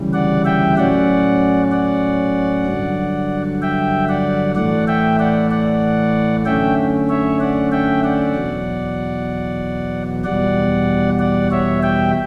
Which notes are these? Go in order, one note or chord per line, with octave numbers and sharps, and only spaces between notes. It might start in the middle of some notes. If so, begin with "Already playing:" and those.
Already playing: D2 C#3 E3 G3
D5 F#5
E5 G5
A2 F#3 C#4 D5 F#5
D5 F#5
G2 D3 F#3
E5 G5
D5 F#5
A2 E3 A3 D5 F#5
E5 G5
D5 F#5
D5 F#5
F#2 D3 A3 C#4 E5 G5
C#5 E5
D5 F#5
E5 G5
D5 F#5
E2 B2 F#3
E2 B2 G3 D5 F#5
D5 F#5
C#5 E5
E5 G5